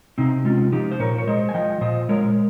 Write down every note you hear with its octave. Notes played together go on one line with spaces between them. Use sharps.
C3 C4 D#4
G#3 C#4 F4
F3 D#4 G4
C5
A#2 A#4 C#5
C#5
G#3 C5 D#5
G#5
F3 D#5 G5
A#2 C5 D#5
G#3 A#4 C#5